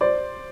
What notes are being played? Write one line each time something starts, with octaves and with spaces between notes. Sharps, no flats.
C5 D5